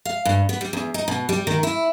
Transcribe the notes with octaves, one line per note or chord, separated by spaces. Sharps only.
F5
G2
B3
G3
E2
D#4
B2
G3
D#3
E4